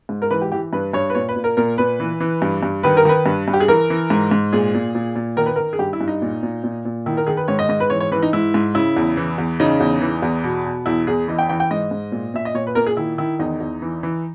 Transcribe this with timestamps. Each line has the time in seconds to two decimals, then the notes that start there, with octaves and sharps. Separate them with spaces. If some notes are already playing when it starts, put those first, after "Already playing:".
0.09 G#2
0.22 A#4
0.31 E3 B4
0.41 G4
0.52 E3 G4
0.73 G2 B4
0.93 G2 C#5
1.10 B4
1.15 A#2 C#5
1.29 B4
1.36 A#2
1.44 A#4
1.57 A#2 A#4
1.78 A#2 B4
2.00 E3
2.20 E3
2.42 G2
2.63 G2
2.83 D#3 B4
2.97 A#4
3.05 D#3 B4
3.26 G2
3.48 G2
3.53 G4
3.60 G#4
3.68 E3 A#4
3.90 E3
4.10 G#2
4.31 G#2
4.53 A#2 G#4
4.74 A#2
4.95 A#2
5.16 A#2
5.37 D#3 A#4
5.46 B4
5.56 D#3 A#4
5.73 G#4
5.79 G2 G4
5.93 E4
6.01 G2
6.08 D#4
6.22 A#2
6.43 A#2
6.64 A#2
6.85 A#2
7.06 D#3 E4
7.17 A#4
7.27 D#3 G#4
7.37 B4
7.48 G#2 C#5
7.59 D#5
7.69 G#2 D#5
7.80 B4
7.90 E3 C#5
8.00 C#5
8.12 E3 B4
8.23 D#4
8.33 G#2 E4
8.54 G#2
8.74 C#3 E4
8.96 E2
9.17 E3
9.38 E2
9.60 C#3 D#4
9.80 E2
10.02 E3
10.22 E2
10.44 B2
10.65 B2
10.86 E2 E4
11.07 E2 G#4
11.28 E3 D#5
11.39 G5
11.49 E3 G5
11.60 G5
11.71 G#2 D#5
11.91 G#2
12.12 A#2
12.34 A#2 E5
12.45 D#5
12.54 A#2 C#5
12.67 B4
12.75 A#2 A#4
12.87 G#4
12.97 D#3 E4
13.18 D#3 E4
13.39 E2 D#4
13.60 E2
13.82 E3
14.03 E3